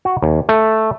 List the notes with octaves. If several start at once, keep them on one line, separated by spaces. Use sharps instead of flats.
F#4
D#2
A3